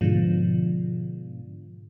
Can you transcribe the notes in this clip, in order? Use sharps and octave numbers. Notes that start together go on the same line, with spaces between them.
G#2 B2 D3 F3